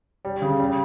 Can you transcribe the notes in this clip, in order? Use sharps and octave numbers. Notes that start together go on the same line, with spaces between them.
G3
C#3
G3